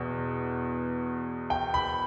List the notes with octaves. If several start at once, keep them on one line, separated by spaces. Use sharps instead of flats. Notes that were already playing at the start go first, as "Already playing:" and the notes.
Already playing: E2 B2
G5
B5